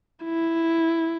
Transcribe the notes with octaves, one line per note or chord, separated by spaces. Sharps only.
E4